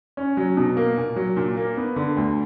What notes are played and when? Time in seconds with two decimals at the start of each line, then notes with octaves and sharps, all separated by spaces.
0.17 C#4
0.37 F#3
0.57 B2
0.77 A#3
0.97 A#2
1.16 F#3
1.37 A#2
1.57 A#3
1.77 B3
1.96 D3
2.17 D2